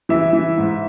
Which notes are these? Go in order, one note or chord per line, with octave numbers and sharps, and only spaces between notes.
E3 E5
E3
G#2